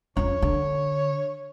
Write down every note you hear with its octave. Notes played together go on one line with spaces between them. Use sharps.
F2 C#4 C#5
D3